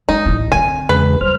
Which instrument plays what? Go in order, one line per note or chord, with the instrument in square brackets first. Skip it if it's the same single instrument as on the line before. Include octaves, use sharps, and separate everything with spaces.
[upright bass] G#3 [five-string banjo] D#4
[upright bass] A1 E4
[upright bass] D3 C4 [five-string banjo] G#5
[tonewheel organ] E2 C#3 G#3 [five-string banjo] B4
[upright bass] G3 [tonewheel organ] C5 F6